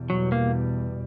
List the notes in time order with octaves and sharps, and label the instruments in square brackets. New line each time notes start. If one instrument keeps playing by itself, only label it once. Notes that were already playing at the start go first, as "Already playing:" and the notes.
Already playing: [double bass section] E2 B2 G3
[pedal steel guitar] F#3
A#3